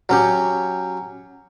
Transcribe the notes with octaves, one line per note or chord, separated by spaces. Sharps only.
F#3 C#4 G4